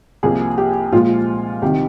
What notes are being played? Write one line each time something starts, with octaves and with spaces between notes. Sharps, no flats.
C2 C3 F3 A#3 G#4
G4
A#2 F3 G#3 F4
C2 C3 D#3 G4